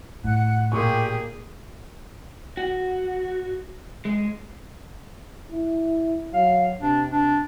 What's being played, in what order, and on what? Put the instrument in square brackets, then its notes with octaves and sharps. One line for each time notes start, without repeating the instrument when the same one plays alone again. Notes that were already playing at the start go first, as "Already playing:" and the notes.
[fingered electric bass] A2 [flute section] F#5 F#6
[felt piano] A#2 C#6 [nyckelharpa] A#3 G#4 [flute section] G4
[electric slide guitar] F#4
G#3
[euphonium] E4
[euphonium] F#3 [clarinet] F5
[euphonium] C3 [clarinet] D4
[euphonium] C3 [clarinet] D4